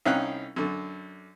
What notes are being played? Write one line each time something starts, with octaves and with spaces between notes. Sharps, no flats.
C2 C#4 D#4 F5 G5 F#6
F#2 D3